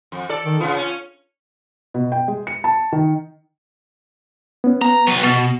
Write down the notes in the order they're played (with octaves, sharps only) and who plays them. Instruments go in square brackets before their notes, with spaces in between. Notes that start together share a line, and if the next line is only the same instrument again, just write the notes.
[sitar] F2
A4 D5
[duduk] D#3
[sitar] C#3 B3 [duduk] F4
[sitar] C#4
[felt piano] B2
G5
G#3
C#7
A5
D#3
[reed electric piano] B3 C#4
[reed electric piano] B3 [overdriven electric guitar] A#5
[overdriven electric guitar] F#3 B4
B2